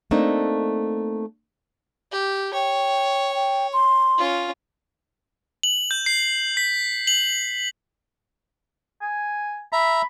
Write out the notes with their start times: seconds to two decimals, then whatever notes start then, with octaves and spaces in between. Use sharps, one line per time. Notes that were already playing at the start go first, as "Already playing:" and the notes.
0.11 A3 A#3 C4 D4 D#4
2.12 G4
2.53 C#5 G5
3.35 G5
3.73 C6
4.18 C#4 F4
5.63 F#7
5.91 G6
6.06 C7
6.57 B6
7.07 F#7
9.02 G#5
9.73 E5 A#5 B5